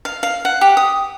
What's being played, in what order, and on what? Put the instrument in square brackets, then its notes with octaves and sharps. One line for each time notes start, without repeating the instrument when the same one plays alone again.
[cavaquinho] F5
F5
F#5
G4
D#6